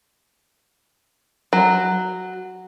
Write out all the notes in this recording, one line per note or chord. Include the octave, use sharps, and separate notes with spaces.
F#3